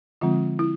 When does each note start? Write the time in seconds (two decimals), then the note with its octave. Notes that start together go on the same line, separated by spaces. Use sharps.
0.21 D3 F3 G#3 C4 F4
0.59 E4